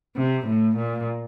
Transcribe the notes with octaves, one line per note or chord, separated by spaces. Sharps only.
C3
A2
A#2